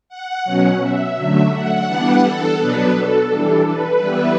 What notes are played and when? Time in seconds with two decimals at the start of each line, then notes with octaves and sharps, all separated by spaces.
0.09 F#5
0.45 B2 F#3 C#4
0.81 E5
1.16 D3 F#3 A3
1.52 F#5
1.87 E3 G3 B3 D4
2.23 A4
2.59 B2 F#3 B3 D4 B4
2.95 A4
3.30 E3 G3 D4
3.66 B4
4.01 E3 G3 B3 E4